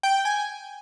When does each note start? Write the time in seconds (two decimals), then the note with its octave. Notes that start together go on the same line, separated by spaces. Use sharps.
0.03 G5
0.14 G5
0.25 G#5